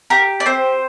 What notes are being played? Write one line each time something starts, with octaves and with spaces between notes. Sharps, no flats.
G4 A#4
D5
C4 C5